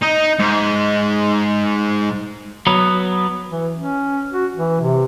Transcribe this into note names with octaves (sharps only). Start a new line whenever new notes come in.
D#4
G#2
F#3 B3
E3
C#4
F#4
E3
C3